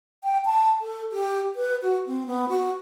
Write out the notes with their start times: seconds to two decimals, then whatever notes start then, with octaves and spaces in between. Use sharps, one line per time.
0.24 G5
0.45 A5
0.81 A4
1.12 G4
1.55 B4
1.82 F#4
2.06 C4
2.26 B3
2.49 F#4